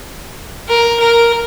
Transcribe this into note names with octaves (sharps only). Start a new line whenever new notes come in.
A#4
A#4